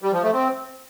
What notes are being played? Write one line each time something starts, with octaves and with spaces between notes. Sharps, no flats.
G3
F3
A3
C4